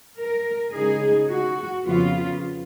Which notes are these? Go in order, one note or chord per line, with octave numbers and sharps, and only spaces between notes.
A#4
C#3 G#3 D#4 G#4
F#4
F2 C#3 F3 B3 F4